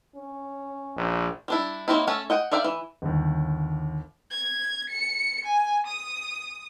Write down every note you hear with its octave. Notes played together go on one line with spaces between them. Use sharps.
C#4
A#1
G3 D4 E4
F#3 A#3 C4 D#4 E4
A3 C#4 A4
D#5 F#5 G5
A#4 D5 E5 F5 G5
E3
G1 D#2
G#6
C#7
G#5
D#6